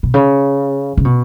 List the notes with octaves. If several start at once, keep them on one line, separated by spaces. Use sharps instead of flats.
B2
C#3
C#3
B2